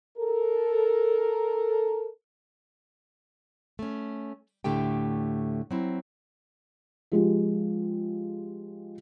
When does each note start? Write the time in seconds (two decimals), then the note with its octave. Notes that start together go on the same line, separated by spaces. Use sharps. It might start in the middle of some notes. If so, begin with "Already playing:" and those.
0.18 A4 A#4
3.79 A3 C#4
4.64 D2 A2 D3 A3 G4 G5
5.71 F#3 C4 E4
7.12 F3 G#3 G4